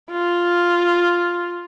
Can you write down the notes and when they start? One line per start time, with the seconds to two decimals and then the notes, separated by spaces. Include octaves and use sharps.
0.11 F4